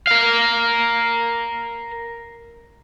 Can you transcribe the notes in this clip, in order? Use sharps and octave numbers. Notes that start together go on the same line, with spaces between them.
A#4 F5